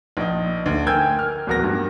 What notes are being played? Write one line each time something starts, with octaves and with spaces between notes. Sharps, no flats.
A#1 D#4
D2
A#4 G5 G#5 E6 G6 G#6
F6
D1 E2 F#4 A#4 A#6
G2